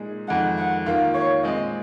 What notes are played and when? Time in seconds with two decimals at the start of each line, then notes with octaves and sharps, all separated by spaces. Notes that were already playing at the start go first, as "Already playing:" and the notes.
Already playing: A#2 G#3 D#4 G#4
0.28 F2 D#3 G#3 F#5
0.58 F#5
0.86 D#3 A#3 F4 F5
1.14 C#5
1.43 A#2 G#3 C4 D#5